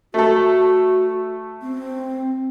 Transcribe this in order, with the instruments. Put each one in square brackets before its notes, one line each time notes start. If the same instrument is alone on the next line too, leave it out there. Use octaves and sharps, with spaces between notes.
[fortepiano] A3 A4 [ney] F#4
[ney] C4